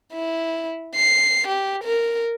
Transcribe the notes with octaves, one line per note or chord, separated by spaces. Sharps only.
E4
C7
G4
A#4